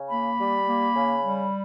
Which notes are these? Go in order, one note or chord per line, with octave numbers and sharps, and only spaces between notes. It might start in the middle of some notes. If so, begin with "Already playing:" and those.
Already playing: C#3
A#3 B5
G3
A#3
C#3
G3